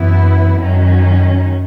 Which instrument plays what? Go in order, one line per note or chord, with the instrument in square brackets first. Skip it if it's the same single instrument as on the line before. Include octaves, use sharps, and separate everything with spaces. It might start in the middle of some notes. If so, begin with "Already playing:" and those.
Already playing: [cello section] F#2 E3 B3 E4
F#2 D#3 F#3 C#4